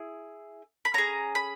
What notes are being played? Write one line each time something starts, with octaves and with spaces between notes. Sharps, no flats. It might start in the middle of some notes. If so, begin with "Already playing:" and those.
Already playing: E4 G#4
B5
C#4 G#4 A#5
B5